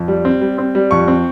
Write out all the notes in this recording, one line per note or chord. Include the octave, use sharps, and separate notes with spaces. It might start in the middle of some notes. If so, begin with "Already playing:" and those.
Already playing: F2
G3
C4
G3
C4
G3
F2 C#6
C4